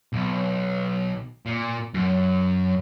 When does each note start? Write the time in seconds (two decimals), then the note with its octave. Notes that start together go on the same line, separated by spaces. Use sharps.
0.13 B1
1.46 A#2
1.94 F#2